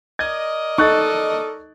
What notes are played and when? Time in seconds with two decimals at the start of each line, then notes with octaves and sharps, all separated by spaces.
0.19 A#4 D5 D#5 G#6
0.78 D#4 A4 C#6 F#6 A6